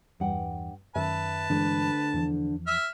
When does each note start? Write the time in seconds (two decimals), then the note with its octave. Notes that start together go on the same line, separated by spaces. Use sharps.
0.20 E2 G2 F#5 G5
0.95 F#2 D#3 C#4 B4 E5 A5
1.50 D2 G2 D3 E3 G#3 D4
2.14 E2 E3 F3
2.67 E5 F6